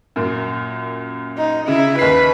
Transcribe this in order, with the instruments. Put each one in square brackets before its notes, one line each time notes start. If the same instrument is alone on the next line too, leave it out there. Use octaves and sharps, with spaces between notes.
[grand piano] F#2 A#2
[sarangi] D#4
[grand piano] C#3 [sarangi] E4
[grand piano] D#2 D#4 C7 [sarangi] B4